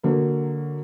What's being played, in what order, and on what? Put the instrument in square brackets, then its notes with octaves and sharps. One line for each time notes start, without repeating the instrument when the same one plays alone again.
[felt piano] D3 F#3 A#3